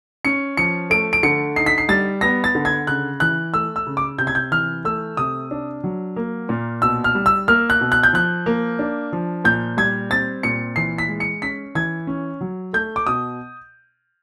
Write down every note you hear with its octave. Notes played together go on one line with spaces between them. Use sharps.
C#4 C#7
F3 C#7
A3 D7
D7
D3 C#7
D#4 C7
B6
C7
G3 A6
B3 A#6
A6
D3
G#6
C#3 F#6
E3 F#6
A3 E6
E6
C#3
D6
C3 G6
G#6
G6
E3 F6
A3 E6
C3 D#6
D4
F#3
A#3
A#2
B2 E6
F6
G3
E6
A#3 F6
F#6
B2
F#6
G6
F3 F#6
A#3
D4
F3
A#2 G6
G3 G#6
C4 A6
A#2 C#7
E3 C7
B6
G#3
C#7
C#4 B6
E3 G#6
C#4
F#3
A3 G6
D6
B2 D#6